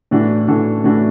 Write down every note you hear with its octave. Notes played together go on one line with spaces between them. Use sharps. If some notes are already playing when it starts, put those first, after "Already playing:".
A2 E3 D4 F#4 A4
A2 E3 D4 F#4 A4
A2 E3 D4 F#4 A4